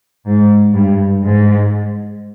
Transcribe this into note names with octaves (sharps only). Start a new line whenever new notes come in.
G#2
G2
G#2